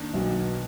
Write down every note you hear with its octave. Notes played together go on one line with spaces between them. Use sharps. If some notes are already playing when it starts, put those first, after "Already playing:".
Already playing: D#3 A#3 D4
B1 B2